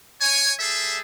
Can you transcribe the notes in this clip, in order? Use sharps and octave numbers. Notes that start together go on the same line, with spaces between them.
C#5 G#5
G3 G#4 A4 E5